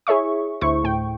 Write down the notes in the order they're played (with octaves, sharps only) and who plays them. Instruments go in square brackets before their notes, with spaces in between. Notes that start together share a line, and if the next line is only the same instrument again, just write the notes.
[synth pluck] E4 G#4 C#5 E5 C#6
D2 E4 C5 C#6
A2 G5